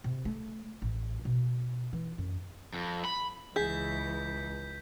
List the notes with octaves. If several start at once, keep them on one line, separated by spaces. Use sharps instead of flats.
C3
A3
A1
B2
E3
F#2
F2
B5
C#2 E3 G#4 G6 B6